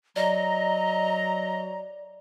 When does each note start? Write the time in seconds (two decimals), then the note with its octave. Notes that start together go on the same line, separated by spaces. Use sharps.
0.16 F#3 D5 D#5 A#5